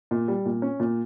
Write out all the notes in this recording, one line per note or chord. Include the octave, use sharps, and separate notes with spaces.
A#2
G3
A#2
C#4
A#2